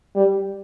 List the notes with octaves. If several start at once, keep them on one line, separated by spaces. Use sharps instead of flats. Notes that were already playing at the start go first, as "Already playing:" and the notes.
G3